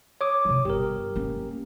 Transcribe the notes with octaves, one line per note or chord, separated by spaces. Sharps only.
C#5 D6 D#6
C3 F3
G1 G4 A#4
A#3 C#4